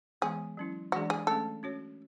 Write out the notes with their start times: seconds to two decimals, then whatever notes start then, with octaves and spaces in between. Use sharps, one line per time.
0.22 E3 G#3 B3 G#4
0.57 F#3 C#4 E4
0.92 E3 G#3 D4 F#4 G#4 D5
1.10 G#4
1.27 A3 C#4 G#4 A4
1.63 C#4 F#4 C#5